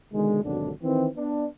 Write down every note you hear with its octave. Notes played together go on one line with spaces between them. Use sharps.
B2 D3 D#3 G#3
G#1 D#2 B2 D3 F#3 D4
D#3 E3 C4
B3 D4